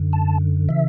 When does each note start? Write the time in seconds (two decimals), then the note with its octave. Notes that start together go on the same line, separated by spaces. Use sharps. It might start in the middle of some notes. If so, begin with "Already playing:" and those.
Already playing: F#2 D3
0.13 A5
0.69 C#3 E3 E5